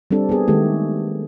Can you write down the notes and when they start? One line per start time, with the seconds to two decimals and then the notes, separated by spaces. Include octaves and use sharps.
0.11 G3 C4 D4 A4
0.29 B3 G#4
0.48 D#3 G#3 A3 G4